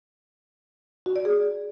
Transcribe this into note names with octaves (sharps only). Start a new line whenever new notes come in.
F#4
D5
G#4